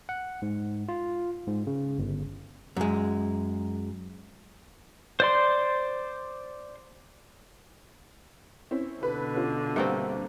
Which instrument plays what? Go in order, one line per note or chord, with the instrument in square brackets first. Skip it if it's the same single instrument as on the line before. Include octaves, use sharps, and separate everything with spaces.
[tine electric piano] F#5
G#2
F4
G#2
C#3
G1
[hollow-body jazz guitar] F#2 G#3
[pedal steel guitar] C5 D5 C6
[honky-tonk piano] C4 C#4 E4
[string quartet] B2 D3 [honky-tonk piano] B4
[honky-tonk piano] C#4 F4
[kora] G2 A#3 C4 [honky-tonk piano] E5 F#5